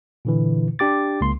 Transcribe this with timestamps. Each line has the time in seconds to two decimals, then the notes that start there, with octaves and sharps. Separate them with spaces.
0.25 A#2 D3 E3
0.79 D4 G4 D6 A6
1.21 C#2 A#3 C6